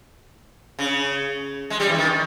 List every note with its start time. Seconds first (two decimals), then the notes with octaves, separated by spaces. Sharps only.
0.79 C#3
1.70 G#3
1.80 G3
1.89 E3
1.98 D#3